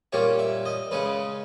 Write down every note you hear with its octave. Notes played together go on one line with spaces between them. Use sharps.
A#2 G3 A#3 C#4 C#5
E5
D#5
C#3 G#3 C#4 B4